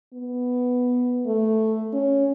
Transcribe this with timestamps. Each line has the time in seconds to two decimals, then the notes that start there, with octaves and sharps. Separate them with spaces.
0.13 B3
1.26 A3
1.93 C#4